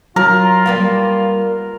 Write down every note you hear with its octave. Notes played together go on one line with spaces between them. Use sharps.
F#3 F4 A#4
G3 A#3 B3 F5